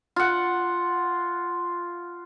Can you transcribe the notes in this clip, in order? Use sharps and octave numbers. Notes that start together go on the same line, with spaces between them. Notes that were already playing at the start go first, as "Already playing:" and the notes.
F4 F#5